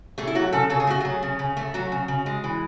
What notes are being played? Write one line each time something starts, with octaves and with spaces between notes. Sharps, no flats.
A3 G#4
E4
F#3 F#4
C#3 A4
C#3 A4
G#4
A3 F#4
F#3 G#4
C#3
C#3
A3
F#3 F#4
C#3
C#3
G#3
E3